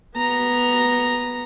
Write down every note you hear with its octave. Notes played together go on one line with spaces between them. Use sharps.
B3 A#5